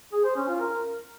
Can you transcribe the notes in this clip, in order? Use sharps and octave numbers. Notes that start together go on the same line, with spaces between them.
G#4
C5
C#4
F4
A#4